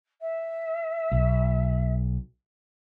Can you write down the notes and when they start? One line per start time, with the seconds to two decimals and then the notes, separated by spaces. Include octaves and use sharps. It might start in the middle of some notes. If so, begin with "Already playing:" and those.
0.21 E5
1.12 B1